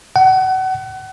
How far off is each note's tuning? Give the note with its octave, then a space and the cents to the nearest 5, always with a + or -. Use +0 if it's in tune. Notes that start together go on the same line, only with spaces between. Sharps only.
F#5 +30